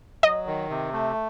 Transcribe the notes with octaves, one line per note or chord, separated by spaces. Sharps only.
F#3 D#5
D#3
C3
A3